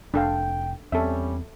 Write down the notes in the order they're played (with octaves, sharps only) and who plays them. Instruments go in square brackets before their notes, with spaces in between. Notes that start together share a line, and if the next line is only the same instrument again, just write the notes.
[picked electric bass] F1 [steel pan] D4 A4 F5 [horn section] G5
[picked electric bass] E2 C4 [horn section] G3 C#4 [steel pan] A4 E5